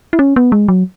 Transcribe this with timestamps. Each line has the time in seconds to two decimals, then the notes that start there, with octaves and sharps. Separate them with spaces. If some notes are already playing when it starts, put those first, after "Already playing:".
0.13 E4
0.19 C#4
0.36 B3
0.52 G#3
0.68 F#3